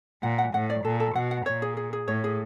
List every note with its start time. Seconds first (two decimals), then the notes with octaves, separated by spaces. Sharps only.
0.23 A#2 F#5
0.38 F#5
0.54 A2 F#5
0.70 D5
0.85 A#2 A4
1.00 A4
1.15 B2 F#5
1.31 F#5
1.46 A#2 C#5
1.62 G#4
1.77 G#4
1.93 G#4
2.08 A2 C#5
2.24 G#4